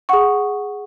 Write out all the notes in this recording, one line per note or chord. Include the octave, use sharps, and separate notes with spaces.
G#4 F#5 C#6